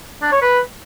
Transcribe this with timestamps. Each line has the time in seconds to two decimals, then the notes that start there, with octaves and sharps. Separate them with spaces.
0.22 D4
0.32 C#5
0.42 B4